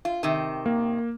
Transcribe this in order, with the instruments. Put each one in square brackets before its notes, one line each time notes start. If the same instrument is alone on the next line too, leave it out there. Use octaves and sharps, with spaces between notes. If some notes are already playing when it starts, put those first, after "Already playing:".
[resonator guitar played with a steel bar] F4
C3 D#3
[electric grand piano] A#3